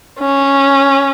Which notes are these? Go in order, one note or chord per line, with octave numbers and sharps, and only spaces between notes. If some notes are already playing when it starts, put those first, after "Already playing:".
C#4